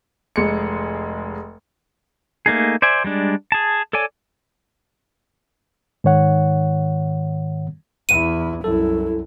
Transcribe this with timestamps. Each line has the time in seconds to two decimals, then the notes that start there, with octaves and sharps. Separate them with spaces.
0.36 F1 G#3 C#7
2.46 A3 A#3 D#4 G#4
2.82 C5 D5 E5 G#5
3.04 G3 G#3 D4
3.52 G#4 A5
3.93 A4 C#5 D5 G#5
6.04 G#2 D#3 C#5 F#5
8.09 E2 E4 D#7
8.64 C2 F#2 E4 A4